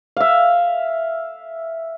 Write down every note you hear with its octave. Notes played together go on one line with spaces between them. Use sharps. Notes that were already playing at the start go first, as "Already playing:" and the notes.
E5 F5